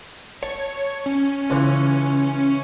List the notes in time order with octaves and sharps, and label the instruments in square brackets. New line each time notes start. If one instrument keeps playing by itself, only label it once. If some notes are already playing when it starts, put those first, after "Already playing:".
[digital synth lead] C#5 [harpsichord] A5
[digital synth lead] C#4
[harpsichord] C#2 E3